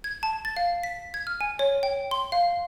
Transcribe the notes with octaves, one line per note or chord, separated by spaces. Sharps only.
G#6
A5
A6
F5
B6
G#6
F6
G#5
C#5
G5
C6
F5